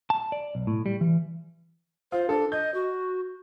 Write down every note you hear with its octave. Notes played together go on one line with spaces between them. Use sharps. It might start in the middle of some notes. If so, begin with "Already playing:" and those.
A5
D5
B1
A2
G3
E3
F4 C5
D4 A4
D#5 G6
F#4